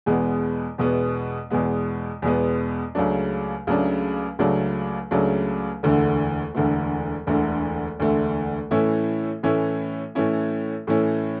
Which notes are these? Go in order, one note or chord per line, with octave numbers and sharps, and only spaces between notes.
E2 B2 G#3 B3
E2 B2 G#3 B3
E2 B2 G#3 B3
E2 B2 G#3 B3
C#2 C#3 F#3 A3 D4
C#2 C#3 F#3 A3 D4
C#2 C#3 F#3 A3 D4
C#2 C#3 F#3 A3 D4
E1 D2 D3 A3
E1 D2 D3 A3
E1 D2 D3 A3
E1 D2 D3 A3
A2 E3 A3 C#4 E4
A2 E3 A3 C#4 E4
A2 E3 A3 C#4 E4
A2 E3 A3 C#4 E4